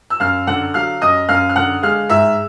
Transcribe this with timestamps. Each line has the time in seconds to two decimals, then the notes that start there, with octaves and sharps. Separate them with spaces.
0.10 E6
0.20 F#2 F5 F6
0.47 D3 F#5 F#6
0.74 F#3 F5 F6
1.01 F#2 D#5 D#6
1.29 F#2 F5 F6
1.49 F6
1.56 D3 F#5 F#6
1.83 G#3 F5 F6
2.09 G#2 E5 E6